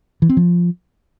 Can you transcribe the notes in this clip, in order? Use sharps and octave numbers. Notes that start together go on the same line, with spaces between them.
E3
C4
F3